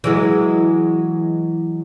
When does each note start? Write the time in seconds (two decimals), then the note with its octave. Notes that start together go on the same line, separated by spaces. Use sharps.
0.04 E3 F#3 G#3